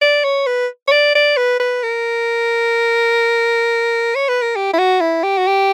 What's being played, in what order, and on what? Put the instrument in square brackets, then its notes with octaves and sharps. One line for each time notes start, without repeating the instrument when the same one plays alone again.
[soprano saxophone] D5
C#5
B4
C#5
D5
D5
B4
B4
A#4
C#5
B4
A#4
G4
E4
F#4
E4
G4
F#4
G4